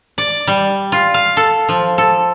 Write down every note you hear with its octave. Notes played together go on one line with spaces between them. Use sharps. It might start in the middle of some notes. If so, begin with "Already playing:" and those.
D5
G3
F4
F5
A4
F3
A4